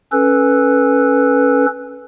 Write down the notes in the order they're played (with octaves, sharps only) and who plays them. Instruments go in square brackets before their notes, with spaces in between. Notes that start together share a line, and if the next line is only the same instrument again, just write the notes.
[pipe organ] C#4 A4 B4